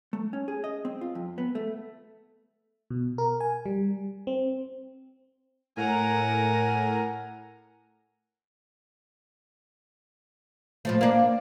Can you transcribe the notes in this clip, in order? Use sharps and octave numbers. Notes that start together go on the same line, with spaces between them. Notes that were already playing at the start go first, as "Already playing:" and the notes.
A3
C#4
G#4
D#5
C4
F4
F2
B3
A3
B2
A#4
G#5
G3
C4
A2 A#4 F#5 G#5 A#5
A2 F3 A3
A#3 D4